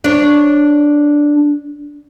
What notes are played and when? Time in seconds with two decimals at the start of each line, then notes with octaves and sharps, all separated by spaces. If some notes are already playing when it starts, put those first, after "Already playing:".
0.04 D4 C#5